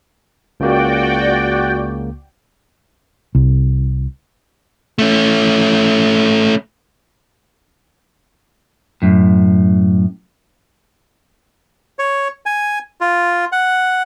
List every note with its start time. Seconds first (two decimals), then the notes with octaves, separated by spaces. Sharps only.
0.60 C#2 C#3 A#3 F#4 D5 G5
3.35 C2
4.99 A3 C#4
9.02 F#2 A2
11.99 C#5
12.46 G#5
13.01 F4
13.52 F#5